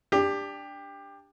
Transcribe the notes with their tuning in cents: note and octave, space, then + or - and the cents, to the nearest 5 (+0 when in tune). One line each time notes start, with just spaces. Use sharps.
D4 +0 G4 +20